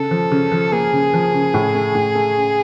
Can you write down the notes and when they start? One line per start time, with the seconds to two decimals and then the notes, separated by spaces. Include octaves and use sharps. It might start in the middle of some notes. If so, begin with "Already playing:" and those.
Already playing: C#3 A4
0.11 F3
0.32 C#3
0.52 F3
0.72 A#3 G#4
0.93 C#3
1.14 F3
1.34 C#3
1.54 A2
1.75 A3
1.95 A2
2.15 A3
2.37 C#4